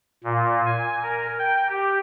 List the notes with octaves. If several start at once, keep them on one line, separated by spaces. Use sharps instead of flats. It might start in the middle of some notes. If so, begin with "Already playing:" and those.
A#2
G#5
A#4
G5
G4